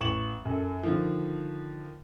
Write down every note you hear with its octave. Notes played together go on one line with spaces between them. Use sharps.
A1 C#6 E7 F#7
F#2 A4
D3 D#3 F3